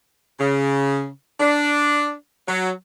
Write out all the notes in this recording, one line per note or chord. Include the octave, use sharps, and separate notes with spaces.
C#3
D4
F#3